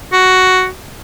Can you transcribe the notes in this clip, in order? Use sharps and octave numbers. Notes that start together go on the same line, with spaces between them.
F#4